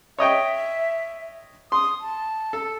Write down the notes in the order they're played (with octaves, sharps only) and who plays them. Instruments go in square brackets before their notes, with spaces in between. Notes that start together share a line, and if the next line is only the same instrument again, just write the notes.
[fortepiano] C#5 D#5 G5 [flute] E5
[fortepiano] C6 [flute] D#6
[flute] A5
[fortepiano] A4